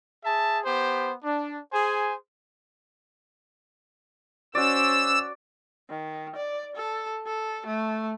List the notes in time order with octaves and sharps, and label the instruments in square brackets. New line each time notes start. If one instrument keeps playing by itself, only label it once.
[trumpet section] G#4 E5 A5
B3 G4 C5
D4
G#4 C5 G#5
[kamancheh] C#4 C5 [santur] F#4 D5 [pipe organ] E6
[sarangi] D#3
D5
A4
A4
A3